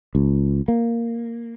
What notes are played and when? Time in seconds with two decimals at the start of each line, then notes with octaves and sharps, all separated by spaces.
0.15 C#2
0.68 A#3